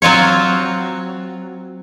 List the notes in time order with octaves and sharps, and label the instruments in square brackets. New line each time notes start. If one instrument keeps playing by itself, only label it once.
[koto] F#3 C4 F4 C#5